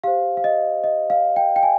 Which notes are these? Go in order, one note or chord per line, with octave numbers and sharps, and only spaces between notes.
G4 C5 F5
F5
D#5
D#5
F5
G5
G5
G#5